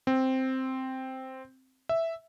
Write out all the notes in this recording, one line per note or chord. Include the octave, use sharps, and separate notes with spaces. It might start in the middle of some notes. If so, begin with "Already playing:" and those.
C4
E5